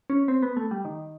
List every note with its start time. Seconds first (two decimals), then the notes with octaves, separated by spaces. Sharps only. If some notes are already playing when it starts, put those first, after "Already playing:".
0.10 C#4
0.28 C4
0.43 B3
0.57 A3
0.71 G3
0.85 D#3